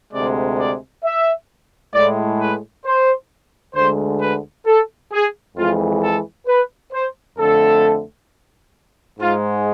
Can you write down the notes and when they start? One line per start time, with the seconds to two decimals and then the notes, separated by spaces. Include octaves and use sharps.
0.12 D2 C3 G#3 D5
0.58 D5
1.03 E5
1.93 A2 G#3 D5
2.40 B4
2.85 C5
3.75 D2 D3 G#3 C5
4.20 B4
4.66 A4
5.12 G#4
5.57 F2 E3 G#3 F4
6.03 A4
6.47 B4
6.92 C5
7.38 F2 D3 A3 A4
9.19 G#2 G#3 F4